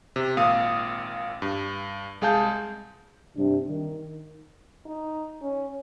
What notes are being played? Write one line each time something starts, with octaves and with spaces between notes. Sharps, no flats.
C3
G#1 A#2 F5 D#6
G2
C2 G#3 G#4 F5 A5 G6
G2 C3 D4
D#3
D#4
C#4